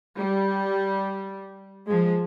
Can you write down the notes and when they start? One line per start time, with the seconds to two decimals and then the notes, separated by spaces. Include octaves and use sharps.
0.16 G3
1.89 F3 G#3